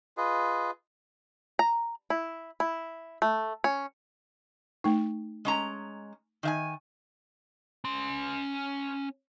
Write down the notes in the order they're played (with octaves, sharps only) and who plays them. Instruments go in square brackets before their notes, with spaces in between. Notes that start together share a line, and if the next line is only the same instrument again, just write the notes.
[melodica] F4 G#4 B4 D#5
[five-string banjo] A#5
E4
E4
A3
C#4
[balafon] A3 D#4
[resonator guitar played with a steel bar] G#3 C#4 A#5
D#3 E5 G#5
[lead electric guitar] C#4 C6